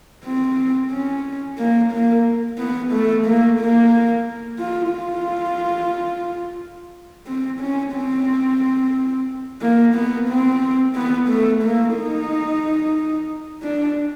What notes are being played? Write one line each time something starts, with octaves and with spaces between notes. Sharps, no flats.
C4
C#4
A#3
A#3
B3
A3
A#3
A#3
F4
F4
C4
C#4
C4
A#3
B3
C4
B3
A3
A#3
D#4
D4